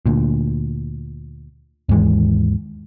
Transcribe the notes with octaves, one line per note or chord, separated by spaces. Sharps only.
D2 A#2
D#2 G#2 E3 G#3